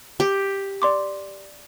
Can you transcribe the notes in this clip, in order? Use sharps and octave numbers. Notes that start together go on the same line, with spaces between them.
G4
D5 C6 D6